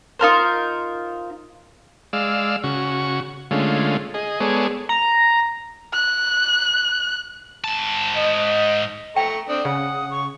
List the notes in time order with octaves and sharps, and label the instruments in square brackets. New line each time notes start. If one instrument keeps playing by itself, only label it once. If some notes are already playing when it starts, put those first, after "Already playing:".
[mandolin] D#4 F4 A#4 C5
[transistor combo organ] G#3 D5 F5 E6
C#3 F#4 C#6
D3 G#3 A3 C#4 F4
G#4 D#5
G#3 B3 G#4 A4 C#5 D5
[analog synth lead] A#5
[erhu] F#6
[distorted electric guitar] G#2 A5
[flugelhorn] D#5
[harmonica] A3 A#5 C#6 [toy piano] G5
[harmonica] C4 D4 [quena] D#6
[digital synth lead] C#3 [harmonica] F#5
[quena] C#6